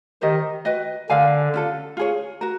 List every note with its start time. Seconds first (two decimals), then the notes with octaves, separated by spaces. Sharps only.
0.22 D#3 G4 C5 D#5
0.65 F#4 B4 D#5 G5
1.09 D3 A#4 D5 F5 G#5
1.54 C#4 F4 A4
1.97 F4 G#4 C#5
2.41 F#4 A#4